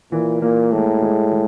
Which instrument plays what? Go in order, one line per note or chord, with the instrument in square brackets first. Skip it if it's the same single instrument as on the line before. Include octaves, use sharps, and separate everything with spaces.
[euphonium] A#2 [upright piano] E3
[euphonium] A#2 [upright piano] A#3
[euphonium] A2 [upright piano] G#3
[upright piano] G#3
G#3